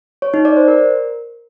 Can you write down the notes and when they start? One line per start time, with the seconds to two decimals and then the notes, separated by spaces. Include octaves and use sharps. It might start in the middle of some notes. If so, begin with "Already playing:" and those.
0.22 C#5
0.34 D#4
0.45 D5
0.56 C5
0.68 A#4